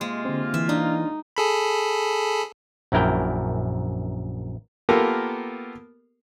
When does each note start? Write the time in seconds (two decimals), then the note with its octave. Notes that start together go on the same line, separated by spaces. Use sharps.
0.01 C3 G#3 A#3 F4
0.25 D3 C4
0.54 E3 E5
0.69 D4 D#4
1.36 G#4 A4 B5
2.92 A#1 F#2 E4 A#4 G5
4.89 A#3 B3 F4 G4 A4 A#4